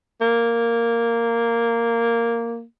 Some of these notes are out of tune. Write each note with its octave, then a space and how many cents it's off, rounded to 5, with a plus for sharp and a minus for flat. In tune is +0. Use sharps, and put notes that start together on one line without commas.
A#3 -5